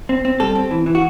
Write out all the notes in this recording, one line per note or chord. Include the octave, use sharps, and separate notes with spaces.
C4
C4
G3 A4
C4
E3
E3
F#4